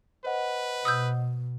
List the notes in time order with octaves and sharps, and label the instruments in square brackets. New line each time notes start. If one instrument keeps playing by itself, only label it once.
[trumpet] B4 [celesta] C5 D#5 F#5
[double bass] B2 [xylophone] D#6 E6 G6